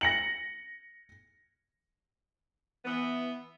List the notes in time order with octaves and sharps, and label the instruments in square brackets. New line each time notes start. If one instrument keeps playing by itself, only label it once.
[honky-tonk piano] A#6 C#7 F#7
[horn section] E3 B3